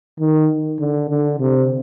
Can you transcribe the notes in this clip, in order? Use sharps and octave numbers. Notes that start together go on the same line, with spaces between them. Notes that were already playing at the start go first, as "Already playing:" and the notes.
D#3
D3
D3
C3